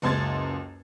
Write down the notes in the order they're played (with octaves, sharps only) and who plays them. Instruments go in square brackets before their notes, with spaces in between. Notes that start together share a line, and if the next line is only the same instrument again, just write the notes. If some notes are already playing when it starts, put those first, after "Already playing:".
[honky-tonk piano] F#1 C#2 C6 G#6 A6